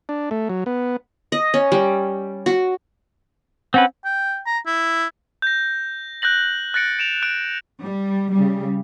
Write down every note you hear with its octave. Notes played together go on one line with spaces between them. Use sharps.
D4
A3
F#3
B3
D#5
C#4
G3
F#4
C4 C#4 B4 F#5
G5
A#5
E4
G6 A#6
F#6 G6 A#6 F#7
F#6 A6 A#6 C#7 D7
D7 E7 F7
F#6 D7
G3
C#3 G3